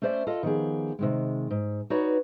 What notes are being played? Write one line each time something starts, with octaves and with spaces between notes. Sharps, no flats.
A3 C#4 C5 D5 E5
F4 A4 D#5
D#3 F3 B3 G4 G#4
C3 D#3 G#3
G#2
D#4 F#4 B4 C#5 D5